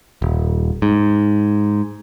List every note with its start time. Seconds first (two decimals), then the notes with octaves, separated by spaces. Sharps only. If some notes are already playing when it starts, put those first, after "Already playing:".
0.22 D#1
0.82 G#2